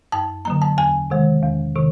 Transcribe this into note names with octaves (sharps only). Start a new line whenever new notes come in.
F#2 A5
D3 F#3 A#3 A#5
A5
E2 G#5
C3 D#3 G#3
E2
C3 D#3